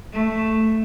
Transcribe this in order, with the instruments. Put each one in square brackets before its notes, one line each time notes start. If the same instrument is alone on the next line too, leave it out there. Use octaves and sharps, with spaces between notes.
[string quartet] A3